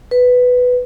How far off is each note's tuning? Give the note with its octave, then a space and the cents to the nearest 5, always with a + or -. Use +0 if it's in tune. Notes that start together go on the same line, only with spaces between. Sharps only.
B4 +5